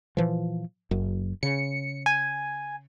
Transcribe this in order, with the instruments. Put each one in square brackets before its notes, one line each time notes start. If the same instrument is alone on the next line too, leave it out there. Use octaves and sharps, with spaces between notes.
[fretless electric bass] A#2 E3 F3
F#1 F#2
[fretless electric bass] C#3 [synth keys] C#7
[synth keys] G#5